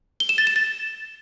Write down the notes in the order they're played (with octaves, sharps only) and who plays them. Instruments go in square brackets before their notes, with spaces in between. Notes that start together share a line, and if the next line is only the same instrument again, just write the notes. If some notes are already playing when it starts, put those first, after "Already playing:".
[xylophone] G7
E7
A6
E7
A6